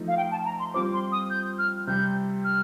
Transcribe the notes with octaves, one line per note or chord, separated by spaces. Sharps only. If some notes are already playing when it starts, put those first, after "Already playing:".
Already playing: F3 A3 D#4
F5
G5
A5
A#5
C6
G3 C4 F4 C5 D6
C6
D#6
G6
F6
C3 G3 C4 G6
F6